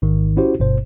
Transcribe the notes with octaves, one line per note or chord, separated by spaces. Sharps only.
A1 G#2 D#3
C#4 E4 F#4 G4 C5
G1 G2 B2 C5